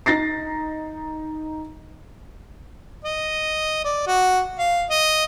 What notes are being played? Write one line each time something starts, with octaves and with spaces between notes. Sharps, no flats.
D#4 A6 A#6 C7
D#5
D5
F#4
F5
D#5